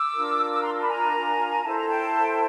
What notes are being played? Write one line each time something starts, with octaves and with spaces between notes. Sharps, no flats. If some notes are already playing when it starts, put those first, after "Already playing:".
Already playing: D6 E6
D4 F4 A#4
D6 E6
A#5 C6
A5 B5
G#5 A#5
E4 A4 C5 A5
A#5
G5 A5
A5